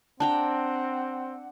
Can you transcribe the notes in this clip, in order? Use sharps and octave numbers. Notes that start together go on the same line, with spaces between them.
C4 D4 F#5 G5 A5 A#5